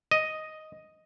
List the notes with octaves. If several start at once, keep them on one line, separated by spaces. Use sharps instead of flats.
D#5